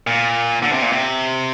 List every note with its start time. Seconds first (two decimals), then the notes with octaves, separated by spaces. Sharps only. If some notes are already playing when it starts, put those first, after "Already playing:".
0.07 A#2
0.62 D3
0.72 C3
0.82 A#2
0.92 C3